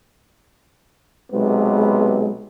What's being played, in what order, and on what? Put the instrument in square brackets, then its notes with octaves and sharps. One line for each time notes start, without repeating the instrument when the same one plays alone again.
[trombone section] B1 C3 B3 [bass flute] G#3